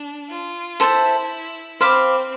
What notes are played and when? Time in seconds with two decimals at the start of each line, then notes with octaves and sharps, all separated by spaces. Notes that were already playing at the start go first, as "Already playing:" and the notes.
Already playing: D4
0.30 F4
0.80 E4 A4 C5 E5 A5
1.80 C4 C5 F5 B5 D6